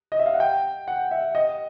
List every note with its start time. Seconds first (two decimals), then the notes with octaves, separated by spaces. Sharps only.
0.12 D#5
0.19 E5
0.26 F5
0.33 F#5
0.40 G5
0.88 F#5
1.11 E5
1.35 D#5